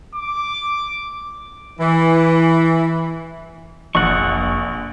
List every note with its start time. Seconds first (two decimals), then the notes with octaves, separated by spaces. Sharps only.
0.15 D6
1.79 E3
3.95 F1 A#1 F#5 C#6